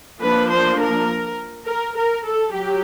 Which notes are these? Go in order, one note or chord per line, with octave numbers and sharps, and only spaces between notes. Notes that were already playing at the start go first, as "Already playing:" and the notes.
F3 A#3 D4 B4
C5
A#4
A#4
A#4
A4
F#3 G4